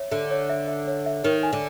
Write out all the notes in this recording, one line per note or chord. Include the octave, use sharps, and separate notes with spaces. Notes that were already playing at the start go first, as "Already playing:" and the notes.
Already playing: C#5 E5
D3 E5
C#5
E5
E5
C#5
E5
D#3 C#5
G#5
D3